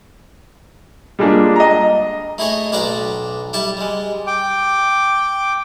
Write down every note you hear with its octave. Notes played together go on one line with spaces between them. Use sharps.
G3 G#3 A#3 D4 F4
D#5 A#5
A3 E4 G#4 C#5 D#5
B1 D4 B4 D5 G5 A#5
G3 E4 G5 A5
G3 G#3
G5 D6